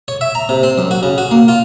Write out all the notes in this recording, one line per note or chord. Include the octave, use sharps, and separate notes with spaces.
C#5
E5
A#5
C3
C4
F#2
F#4
C#3
F#4
A#3
F4